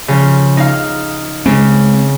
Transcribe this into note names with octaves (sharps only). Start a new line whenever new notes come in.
C#3 F3
D#4 F5
C#3 G#3 C4